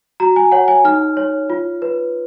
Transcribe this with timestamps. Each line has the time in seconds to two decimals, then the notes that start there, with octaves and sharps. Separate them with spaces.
0.20 F#4 A#5
0.36 G#5
0.52 C#5 F#5
0.68 G#5
0.85 D#4 F6
1.17 C#5
1.50 F4
1.82 B4